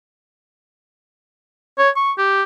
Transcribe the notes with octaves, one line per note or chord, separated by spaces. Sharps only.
C#5
C#6
G4